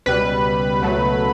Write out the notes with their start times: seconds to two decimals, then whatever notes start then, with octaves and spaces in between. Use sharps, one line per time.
0.06 C#2 B2 G3 B4
0.82 C#2 B2 F#3 A3